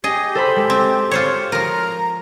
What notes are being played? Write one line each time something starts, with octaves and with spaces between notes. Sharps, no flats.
G4 G#4 D#5
A4 C5 B5
G#3 A4
C4
F4 C5 C#5
F3 A#4 A#5